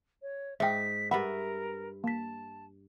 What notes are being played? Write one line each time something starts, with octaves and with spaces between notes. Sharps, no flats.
C#5
G#2 D#4 E5 G5 B6
G2 A#4 B4 E5 F#5 B5
A#3 A5 B6